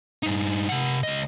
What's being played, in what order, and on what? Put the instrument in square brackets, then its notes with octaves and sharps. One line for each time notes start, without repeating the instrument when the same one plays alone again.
[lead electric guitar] G2 D#4
C3 F#5
C#2 D#5